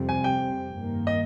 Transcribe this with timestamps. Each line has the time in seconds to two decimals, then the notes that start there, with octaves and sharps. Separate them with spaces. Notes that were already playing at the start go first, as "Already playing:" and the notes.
Already playing: F2 C3 G3 C4
0.09 G#5
0.24 G5
0.72 G2 D#3 A#3
1.07 D#5